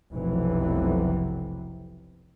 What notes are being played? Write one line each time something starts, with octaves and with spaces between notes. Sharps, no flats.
F1 B1 F2 C3 E3 F#3